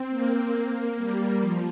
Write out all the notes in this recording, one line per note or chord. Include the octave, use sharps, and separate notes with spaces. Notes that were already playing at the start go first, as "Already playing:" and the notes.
Already playing: C4
A#3
A#3
G3
F3